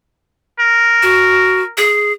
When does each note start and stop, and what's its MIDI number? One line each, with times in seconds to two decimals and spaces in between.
0.59 1.74 70
1.02 1.62 66
1.77 2.12 68